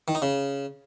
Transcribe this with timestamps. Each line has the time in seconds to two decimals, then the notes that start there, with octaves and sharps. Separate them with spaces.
0.08 D#3
0.15 D#4
0.22 C#3